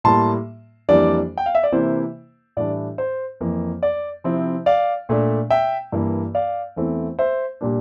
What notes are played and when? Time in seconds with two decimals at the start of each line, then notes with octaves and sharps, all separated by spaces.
0.04 A2 G3 A#3 A5 C6
0.89 F2 E3 G3 A#3 D4 D5
1.37 G5
1.46 F5
1.55 E5
1.64 D5
1.72 C3 E3 A#3 E4 C5
2.57 A2 E3 G3 D4 D5
2.98 C5
3.41 F2 E3 A#3
3.83 D5
4.24 C3 F3 C4 E4
4.66 D5 F5
5.09 A#2 A3 D4
5.50 E5 G5
5.92 G2 E3 A#3
6.35 D5 F5
6.76 E2 E3 A3 C4 E4
7.19 C5 E5
7.61 A#2 G3 A#3 D4